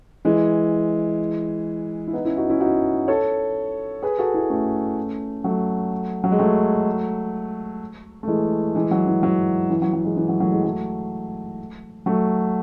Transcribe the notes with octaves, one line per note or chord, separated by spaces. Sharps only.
E3 G#3
E4
B3 D#4
C#4 E4
D#4 F#4
C#4 E4
D#4 F#4
A4 C#5
G#4 B4
F#4 A4
E4 G#4
A3 C#4
F#3 A3
F#3
G#3
F#3 A3
A3
E3 G#3
E3 G#3
F#3
E3
F#3
E3
F#3
F#3
E3 G#3
E3
F#3
F#3 A3
E3 G#3
F#3 A3
F#3 A3